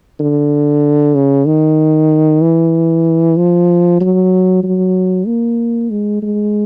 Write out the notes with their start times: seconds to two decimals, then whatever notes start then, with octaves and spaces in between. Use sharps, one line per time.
0.20 D3
1.15 C#3
1.47 D#3
2.41 E3
3.37 F3
4.01 F#3
4.63 F#3
5.27 A#3
5.90 G#3
6.22 G#3